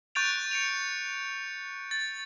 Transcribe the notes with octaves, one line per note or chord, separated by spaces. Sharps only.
C#6 F#6 G6 A6 D7 F7
C#7 D7 F7
A6